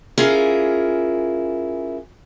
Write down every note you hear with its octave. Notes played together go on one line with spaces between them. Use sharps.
C#4 E4 F4 G#4 A#4